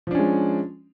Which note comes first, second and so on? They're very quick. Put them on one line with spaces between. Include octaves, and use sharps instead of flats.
F3 D4 C#4 G#3